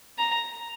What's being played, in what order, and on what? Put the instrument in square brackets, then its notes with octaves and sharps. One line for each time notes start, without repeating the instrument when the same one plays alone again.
[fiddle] A#5